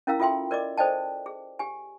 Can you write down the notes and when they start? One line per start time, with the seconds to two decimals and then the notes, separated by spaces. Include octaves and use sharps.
0.07 C#4 E4 A#4 F5 A#5 E6
0.20 F4 A4 E5 G5 C6
0.51 A#4 D5 D#5 D6
0.78 A4 C5 D5 D#5 G5 A5
1.26 G#4
1.59 G4 G#5